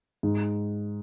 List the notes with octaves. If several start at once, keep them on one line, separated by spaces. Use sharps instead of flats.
G#2